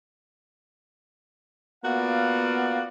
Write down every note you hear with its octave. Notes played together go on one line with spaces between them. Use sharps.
A#3 B3 F4 F#4 D5 F5